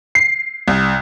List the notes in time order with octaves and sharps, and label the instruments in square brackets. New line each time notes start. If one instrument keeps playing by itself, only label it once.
[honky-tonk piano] C7
C2